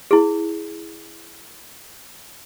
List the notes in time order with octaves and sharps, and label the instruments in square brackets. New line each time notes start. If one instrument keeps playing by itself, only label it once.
[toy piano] E4 G#4